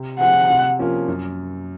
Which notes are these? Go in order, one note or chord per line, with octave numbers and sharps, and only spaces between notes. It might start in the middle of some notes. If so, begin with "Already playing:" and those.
Already playing: C3
F3 C4 F4 G#4 F#5
C3
F3 A#3 C#4 F4
F#2